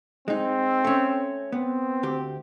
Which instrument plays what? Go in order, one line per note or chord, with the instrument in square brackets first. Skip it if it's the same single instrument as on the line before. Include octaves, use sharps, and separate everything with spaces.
[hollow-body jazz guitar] G#3 D#4 [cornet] C4
[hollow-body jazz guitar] A3 C#4
[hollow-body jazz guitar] B3 [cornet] C4
[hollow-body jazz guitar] D2 G4